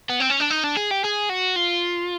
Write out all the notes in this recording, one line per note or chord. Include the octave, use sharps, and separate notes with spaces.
B3
C4
C#4
D4
D#4
D4
G#4
G4
G#4
F#4
F4